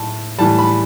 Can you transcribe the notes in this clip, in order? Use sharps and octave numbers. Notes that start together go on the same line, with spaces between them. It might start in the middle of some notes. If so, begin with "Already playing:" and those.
Already playing: A2 A5
A2 E3 G3 A5
B5